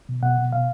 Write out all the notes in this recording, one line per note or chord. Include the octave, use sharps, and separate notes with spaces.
B2
B2 F#5
B2
B2 F5